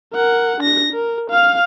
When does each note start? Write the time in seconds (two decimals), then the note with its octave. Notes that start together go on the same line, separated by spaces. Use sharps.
0.13 A#4 F#5
0.61 D4 A#6
0.93 A#4
1.30 F5 F6